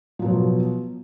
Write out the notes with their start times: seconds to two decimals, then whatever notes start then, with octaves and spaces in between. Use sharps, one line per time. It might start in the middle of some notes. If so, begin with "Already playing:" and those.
0.19 F3
0.22 F#3
0.25 B2